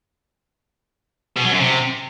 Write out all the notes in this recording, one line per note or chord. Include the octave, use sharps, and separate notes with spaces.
B2
F#3
F#2
C3